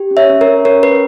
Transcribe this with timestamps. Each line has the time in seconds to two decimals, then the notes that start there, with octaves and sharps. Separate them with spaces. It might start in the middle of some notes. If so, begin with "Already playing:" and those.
Already playing: G4
0.11 C#4
0.17 C#5 E5
0.29 C#4
0.41 A#4 C#5
0.47 C#4
0.65 C#4 A#4 C#5
0.83 C#4 B4